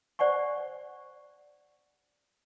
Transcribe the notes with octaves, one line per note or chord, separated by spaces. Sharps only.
C5 D5 F#5 G#5 C#6